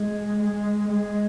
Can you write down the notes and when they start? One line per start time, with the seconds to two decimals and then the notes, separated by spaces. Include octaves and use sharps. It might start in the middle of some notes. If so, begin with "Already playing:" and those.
Already playing: G#3
0.40 G#3
0.89 G#3